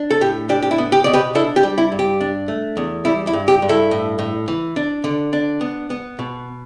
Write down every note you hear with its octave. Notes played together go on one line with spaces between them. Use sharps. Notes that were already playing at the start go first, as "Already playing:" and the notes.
Already playing: D4
A4
A2 G4
D4 G4
G4
E4
B3
G4
B2 D5
G4 B4
D4 E4 A4
G4
G3
E4
G2
G4
D4
A3
E2
G3 E4
E4
G2
G4
G2
E4 A4
A2
A2
E3
D4
D3
D4
B3
B3
B2